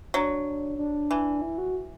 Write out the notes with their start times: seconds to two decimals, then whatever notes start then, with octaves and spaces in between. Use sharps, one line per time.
0.14 F#3 D4
0.78 D4
1.11 E3
1.42 E4
1.58 F#4